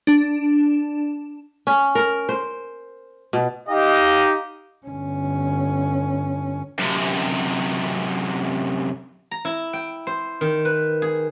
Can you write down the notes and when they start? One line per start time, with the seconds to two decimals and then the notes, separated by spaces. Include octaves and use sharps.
0.07 D4
1.67 C#4
1.95 A#4
2.29 C5
3.33 B2
3.69 D#4 G4 D#5 F5
4.87 G1 C#4
6.79 F#2 C3
9.31 A#5
9.45 E4
9.73 G5
10.07 C5
10.41 D#3
10.65 B4
11.02 G#4